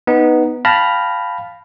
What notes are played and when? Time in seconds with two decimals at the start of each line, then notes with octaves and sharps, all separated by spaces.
0.07 B3 D#4
0.65 F5 G5 A5 B5 F6 A#6